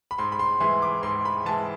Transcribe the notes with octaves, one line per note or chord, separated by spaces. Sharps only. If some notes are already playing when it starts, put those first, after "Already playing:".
B5
G#2 C6
B5
C6
E3 G#3 C6
D6
G#2 C6
B5
E3 G#3 A5